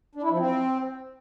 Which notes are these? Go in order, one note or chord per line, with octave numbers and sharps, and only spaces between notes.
D4
E4
F3
C4